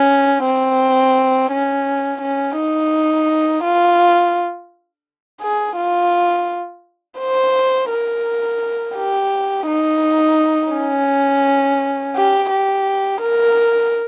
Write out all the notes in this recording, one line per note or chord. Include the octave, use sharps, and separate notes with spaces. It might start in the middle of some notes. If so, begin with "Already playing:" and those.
Already playing: C#4
C4
C#4
C#4
D#4
F4
G#4
F4
C5
A#4
G4
D#4
C#4
G4
G4
A#4